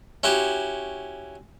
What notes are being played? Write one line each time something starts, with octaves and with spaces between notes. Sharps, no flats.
C#4 E4 F#4 G4